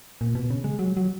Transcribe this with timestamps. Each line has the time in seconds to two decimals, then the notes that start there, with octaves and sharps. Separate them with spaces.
0.21 A#2
0.35 B2
0.50 C#3
0.64 G#3
0.79 F#3
0.97 F#3